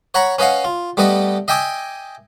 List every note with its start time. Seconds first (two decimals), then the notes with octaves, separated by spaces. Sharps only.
0.14 C#5 F#5 A#5 B5 C#6
0.39 C#4 B4 D#5 F5 F#5
0.64 F4
0.97 G3 A3 B3 B4 D#5
1.48 D#5 E5 G5 G#5 D6 D#6